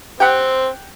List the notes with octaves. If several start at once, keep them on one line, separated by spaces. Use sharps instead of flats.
C4 G4 F#5